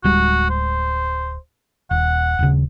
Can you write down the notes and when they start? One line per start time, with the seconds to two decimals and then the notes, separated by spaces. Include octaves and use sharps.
0.04 D1 G3 G#3 F#4
0.50 C5
1.91 D#1 F#5
2.39 D#1 C#3